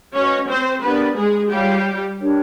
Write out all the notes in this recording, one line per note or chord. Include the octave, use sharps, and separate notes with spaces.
C#4 F#4 B4 C#5 D#5
C4 C5
B3 D4 G4 A#4 B4 D5
G#3 G#4
G3 F4 G4 G#4 C#5 F5
D4 G4 A#4 C#5